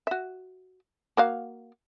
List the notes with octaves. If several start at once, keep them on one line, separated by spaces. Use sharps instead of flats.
F#4 E5
A#3 F#4 F5